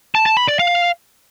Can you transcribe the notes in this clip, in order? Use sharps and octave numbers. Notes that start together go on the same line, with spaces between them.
A5
A5
B5
D5
F5